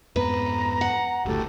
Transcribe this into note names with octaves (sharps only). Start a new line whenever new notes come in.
F2 G#2 B3 B4 A#5
F#5
F#1 D2 A2 F#4 G4 A4